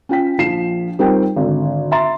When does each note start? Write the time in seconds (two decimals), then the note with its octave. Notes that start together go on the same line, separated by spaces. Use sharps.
0.09 C#4 F4 G5 B6
0.38 A#1 F3 C7 E7
0.99 G3 C4 D#4 F4 A#4 G5
1.36 G#1 D3
1.91 E5 A#5 C6 A6